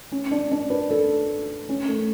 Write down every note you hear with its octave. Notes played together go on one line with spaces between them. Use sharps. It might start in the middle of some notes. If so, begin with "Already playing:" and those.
C#4
D4
D4
B4
A4
C#4
A3